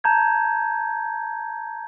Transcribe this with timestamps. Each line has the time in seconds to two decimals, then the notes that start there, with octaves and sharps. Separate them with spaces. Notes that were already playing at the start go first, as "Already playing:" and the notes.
0.04 A5 A#5 G6 G#6